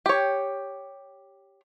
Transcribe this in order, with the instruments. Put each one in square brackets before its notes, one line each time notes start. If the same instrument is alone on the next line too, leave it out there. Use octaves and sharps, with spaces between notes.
[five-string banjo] G4 C#5